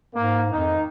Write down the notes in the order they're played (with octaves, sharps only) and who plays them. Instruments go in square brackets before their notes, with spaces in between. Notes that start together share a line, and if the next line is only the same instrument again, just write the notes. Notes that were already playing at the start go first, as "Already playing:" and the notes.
[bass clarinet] G#2 [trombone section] A#3
[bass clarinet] F2 [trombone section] D#3 D#4